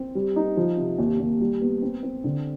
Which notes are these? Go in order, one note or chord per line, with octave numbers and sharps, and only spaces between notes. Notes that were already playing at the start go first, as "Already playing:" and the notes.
Already playing: C4
G3
D#4
F3
C3
D#2
D#2
G3
B3
C4
C4
D3